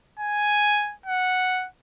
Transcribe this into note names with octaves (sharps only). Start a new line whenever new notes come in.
G#5
F#5